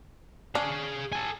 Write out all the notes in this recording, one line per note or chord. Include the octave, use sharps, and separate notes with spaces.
D4 G#4 F5
A4 G#5